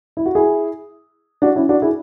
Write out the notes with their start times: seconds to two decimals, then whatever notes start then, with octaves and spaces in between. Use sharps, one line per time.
0.17 E4
0.26 F#4
0.35 E4 G#4
1.42 D4 F#4
1.55 C#4 E4
1.69 D4 F#4
1.82 E4 G#4